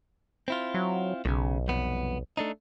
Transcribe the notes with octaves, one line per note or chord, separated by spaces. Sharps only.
C4 E4 F4
F#3
B1 A2 C#3
C2 F2 B3
A3 D4 D#4